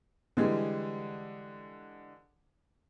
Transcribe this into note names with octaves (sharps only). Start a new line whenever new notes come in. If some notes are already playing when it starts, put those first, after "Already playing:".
D3 E3 G3 G#3